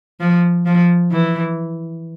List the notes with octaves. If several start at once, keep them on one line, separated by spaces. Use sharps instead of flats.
F3
F3
E3